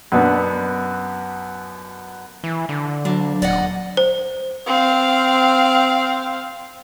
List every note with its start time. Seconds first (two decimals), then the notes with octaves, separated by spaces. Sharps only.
0.12 F#2 B2 B3 D4
2.44 E3
2.69 D3
3.05 D2 F#3 A#3 D4
3.42 D#1 D5 D#5 F#5
3.97 C5
4.67 C4 F5